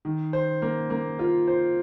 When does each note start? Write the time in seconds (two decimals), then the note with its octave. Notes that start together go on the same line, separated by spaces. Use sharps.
0.05 D#3
0.33 C5
0.62 A#3
0.90 A#3
1.19 F4
1.48 C5